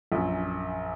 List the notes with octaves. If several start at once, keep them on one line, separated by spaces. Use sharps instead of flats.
A#1 F#2